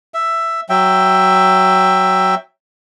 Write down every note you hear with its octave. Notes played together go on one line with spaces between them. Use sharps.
E5
F#3 E5 G5